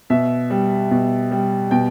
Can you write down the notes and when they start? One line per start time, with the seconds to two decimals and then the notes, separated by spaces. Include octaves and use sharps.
0.10 B2 E5
0.50 G3
0.91 B2
1.31 G3
1.71 B2 G5